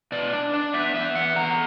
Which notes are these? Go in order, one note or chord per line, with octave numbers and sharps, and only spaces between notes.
B2 D5
D4
D4
B3 E5
B3 E5
E2 F#5
B3 A#5